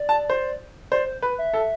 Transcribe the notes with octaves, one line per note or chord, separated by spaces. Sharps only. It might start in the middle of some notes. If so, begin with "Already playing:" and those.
Already playing: D5
A5
C5
C5 D5
C5
B4
E5
A4